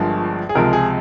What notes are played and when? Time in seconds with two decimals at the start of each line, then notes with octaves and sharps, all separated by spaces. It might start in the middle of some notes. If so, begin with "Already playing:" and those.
Already playing: G1 G2 F3 G#3 A#4
0.49 G#4
0.55 C#2 C3 F3 G#3 A#4
0.73 G#4